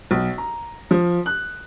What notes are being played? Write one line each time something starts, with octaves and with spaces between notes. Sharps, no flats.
B1
A#5
F3
F#6